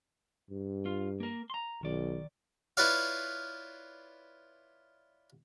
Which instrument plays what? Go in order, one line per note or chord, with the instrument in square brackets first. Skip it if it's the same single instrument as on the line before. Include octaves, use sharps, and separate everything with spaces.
[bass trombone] G2
[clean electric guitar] F4
A#3 A#4
A#5 C6
[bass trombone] B1 [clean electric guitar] D#3 D5
[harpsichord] E4 F4 B4 C#5 D5 F5